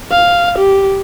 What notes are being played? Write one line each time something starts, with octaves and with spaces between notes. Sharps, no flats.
F5
G4